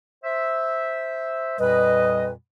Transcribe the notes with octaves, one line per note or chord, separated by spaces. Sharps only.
C5 E5
F2 A#2 G3 B4 D#5